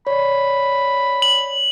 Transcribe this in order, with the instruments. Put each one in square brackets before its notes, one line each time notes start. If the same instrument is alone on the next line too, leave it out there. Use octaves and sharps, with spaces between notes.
[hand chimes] C#5 D5 [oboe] B5
[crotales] F#7